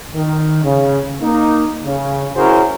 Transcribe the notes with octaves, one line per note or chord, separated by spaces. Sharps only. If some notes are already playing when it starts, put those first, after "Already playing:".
D#3
C#3
A#3 D#4
C#3
C#4 E4 F#4 G#4 A#4 C5